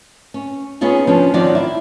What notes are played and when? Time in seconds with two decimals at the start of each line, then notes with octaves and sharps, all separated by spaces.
0.34 C#4
0.81 B3 C#4 D#4 F4 G#4
1.07 F3 C#4 D4
1.34 D#3 F3 F#3 C4 D5
1.55 E4